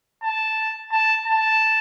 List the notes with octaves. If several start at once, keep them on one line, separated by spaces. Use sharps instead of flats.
A5
A5
A5